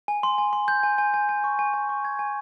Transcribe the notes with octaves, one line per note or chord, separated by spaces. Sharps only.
G#5
C6
G#5
C6
G6
G#5
G#5
G#5
G#5
C#6
G#5
G#5
C#6
G#6
G#5